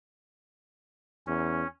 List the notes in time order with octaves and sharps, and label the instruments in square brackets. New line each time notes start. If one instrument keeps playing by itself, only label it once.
[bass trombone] E2 [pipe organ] C#4